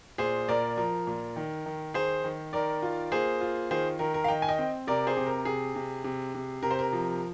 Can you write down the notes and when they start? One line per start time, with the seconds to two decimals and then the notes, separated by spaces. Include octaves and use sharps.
0.18 A#2 G#4 C5
0.48 A#2 A#4 D5
0.77 F3 A#4
1.07 A#2
1.36 D#3
1.66 D#3
1.94 D#3 G#4 C5
2.24 D#3
2.53 D#3 A#4 D5
2.82 F4
3.12 A#3 G#4 C5
3.41 F4
3.71 D#3 G#4 C5
3.99 D#3 A#4
4.14 A#4
4.24 F5
4.28 D#3 D#5 G5
4.42 G#5
4.48 D#5 G5
4.59 C4
4.87 C3 A#4 D5
5.07 G#4 C5
5.17 C3
5.26 A#4
5.45 C3 G#4
5.75 C3
6.04 C3
6.34 C3
6.63 C3 A#4
6.71 C5
6.79 A#4
6.93 F3